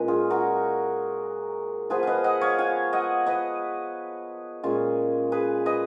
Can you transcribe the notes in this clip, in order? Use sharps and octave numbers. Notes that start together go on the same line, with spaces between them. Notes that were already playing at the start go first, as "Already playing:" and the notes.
Already playing: A#2 G#3 C#4 B4 D#5
F4 G#4
F#4 A#4
F3 B3 F4 G#4 B4
B4 D#5 F5
D#5 F#5
C#5 F5
F5 G#5
D#5 F#5
B4 D#5
A#2 G#3 C#4 F4
G#4 B4
B4 D#5